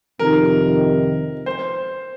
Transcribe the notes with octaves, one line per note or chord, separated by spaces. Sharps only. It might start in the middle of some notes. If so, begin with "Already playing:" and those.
F2 C3 D#3 A#4
C5